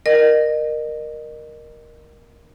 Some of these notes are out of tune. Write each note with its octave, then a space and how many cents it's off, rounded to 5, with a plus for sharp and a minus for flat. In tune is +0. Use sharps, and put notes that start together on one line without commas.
A#4 +10 D#5 -35